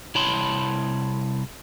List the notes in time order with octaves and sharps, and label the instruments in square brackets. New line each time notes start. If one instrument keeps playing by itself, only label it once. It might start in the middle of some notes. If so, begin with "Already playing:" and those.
[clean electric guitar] C2 E4 C#5 A5 B5 C6